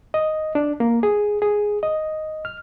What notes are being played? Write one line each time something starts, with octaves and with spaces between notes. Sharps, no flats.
D#5
D4
A#3
G#4
G#4
D#5
F6